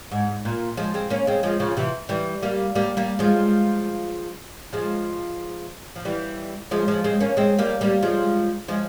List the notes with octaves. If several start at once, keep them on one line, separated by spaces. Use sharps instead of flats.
G#2
A#2
F3 G#3
G#3 C4
A#3 C#4
G#3 C4
F3 G#3
C#3 F3
C3 E3
E3 G3
G3 A#3
G3 A#3
G3 A#3
F3 G#3
F3 G#3
F3
E3 G3
F3 G#3
F3 G#3
G#3 C4
A#3 C#4
G#3 C4
G3 A#3
G3 A#3
F3 G#3
F3 G#3